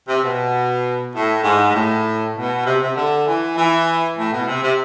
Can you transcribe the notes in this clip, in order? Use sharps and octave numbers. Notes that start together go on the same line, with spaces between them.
C3
B2
A2
G#2
G#2
A2
B2
C3
C3
D3
E3
E3
A2
B2
C3
C3